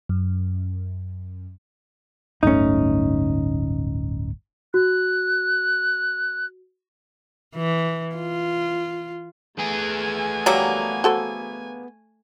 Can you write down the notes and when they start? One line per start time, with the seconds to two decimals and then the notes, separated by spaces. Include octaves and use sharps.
0.09 F#2
2.43 D1 G1 A3 C#4 D#4
4.74 F#4 F#6
7.56 E3
8.16 F4
9.58 A3 B3 G#4 G#5
10.46 D3 F#3 G3 A#3
11.04 F#4 A4 C5